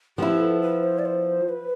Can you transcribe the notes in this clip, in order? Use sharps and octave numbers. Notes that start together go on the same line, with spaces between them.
F3 B3 E4 G4
A4
B4
C5
D5
C5
B4